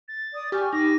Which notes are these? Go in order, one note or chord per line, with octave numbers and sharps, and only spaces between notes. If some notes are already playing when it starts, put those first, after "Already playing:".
A6
D5 D#6
G4 G#5 C#6 F6
D#4 D6 A#6